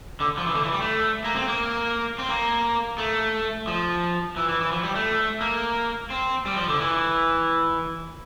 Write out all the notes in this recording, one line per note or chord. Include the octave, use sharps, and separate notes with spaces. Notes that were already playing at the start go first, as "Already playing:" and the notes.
D3
F3
E3
D3
E3
G3
A3
A#3
C4
A#3
C4
A#3
A3
F3
E3
E3
E3
F3
G3
A3
A#3
C4
G3
F3
D3
E3